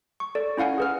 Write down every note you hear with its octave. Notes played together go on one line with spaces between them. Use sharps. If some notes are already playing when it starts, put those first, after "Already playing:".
C#6
A4 D5
C#4 E4 F5 F#5 G#5
G#4 B4 F6